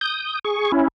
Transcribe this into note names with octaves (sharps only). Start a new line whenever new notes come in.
D#6 G6
G#4 C#6
C#4 E4